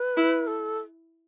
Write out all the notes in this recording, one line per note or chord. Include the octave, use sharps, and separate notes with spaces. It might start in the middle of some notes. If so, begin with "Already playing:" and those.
Already playing: B4
E4
A4